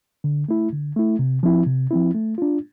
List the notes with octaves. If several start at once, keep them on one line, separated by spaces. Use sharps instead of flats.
D3
A3 E4
D3
A3 E4
C3
F3 C4 E4
C3
F3 C4 E4
A3
D4 F4